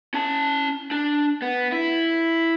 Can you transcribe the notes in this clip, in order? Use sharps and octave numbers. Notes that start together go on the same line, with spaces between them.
C#4 A5
D4
B3
E4